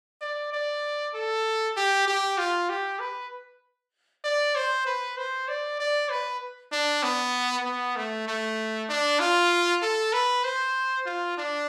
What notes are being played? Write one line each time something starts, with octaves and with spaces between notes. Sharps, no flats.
D5
D5
A4
G4
G4
F4
G4
B4
D5
C5
B4
C5
D5
D5
B4
D4
B3
B3
A3
A3
D4
F4
A4
B4
C5
F4
D4